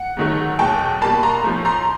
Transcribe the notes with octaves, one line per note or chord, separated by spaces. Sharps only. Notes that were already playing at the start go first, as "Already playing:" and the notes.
Already playing: F#5
G#2 D#3 F#3 A3
E2 B2 F#3 A3 G5 A5
B2 G3 A#3 A5 B5
A#5 C6
A2 F3 A3
A#5 C6